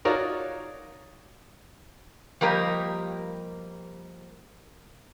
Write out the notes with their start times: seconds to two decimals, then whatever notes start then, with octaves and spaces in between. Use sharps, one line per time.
0.05 D#4 F4 F#4 A#4 C#5 D5
2.41 F3 G3 A#3 G4 A#4 D#5